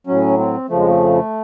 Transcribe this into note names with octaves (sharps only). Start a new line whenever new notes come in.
A2 F#3 C#4
C4
F2 C#3 F3 A3
G#3
A3